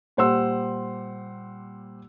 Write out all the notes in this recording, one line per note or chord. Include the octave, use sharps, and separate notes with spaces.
A#2 G3 C5 F#5 C6 E6